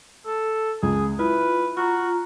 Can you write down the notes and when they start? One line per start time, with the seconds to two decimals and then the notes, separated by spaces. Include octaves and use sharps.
0.26 A4
0.83 C#2 G#4
1.19 E4 F4 B4
1.77 F4 F#4 A#5